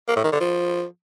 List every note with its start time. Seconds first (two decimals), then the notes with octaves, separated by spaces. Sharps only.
0.08 A#3
0.16 A2
0.24 D#3
0.32 D3
0.40 F3